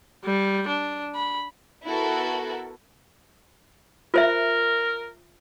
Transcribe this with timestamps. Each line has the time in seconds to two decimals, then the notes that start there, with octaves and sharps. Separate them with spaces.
0.25 G3
0.68 D4
1.15 B5
1.85 B3 E4 F#4 A4 A#4
4.14 F4 A#4 C5 E5